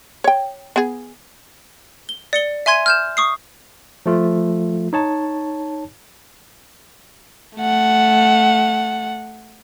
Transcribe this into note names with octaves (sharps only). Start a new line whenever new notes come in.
C#5 G5
B3 G#4
G7
D5 C#7 G7
E5 G#5 C6 G#6 D#7
F6 G6 E7
C#6 D#6 C7
F3 A3 F4
D#4 C#5 A5
A3 F#5